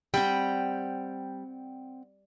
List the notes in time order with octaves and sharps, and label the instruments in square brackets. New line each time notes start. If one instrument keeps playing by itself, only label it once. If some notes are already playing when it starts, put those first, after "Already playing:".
[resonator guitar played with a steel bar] G3 [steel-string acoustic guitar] C4 F#5 G5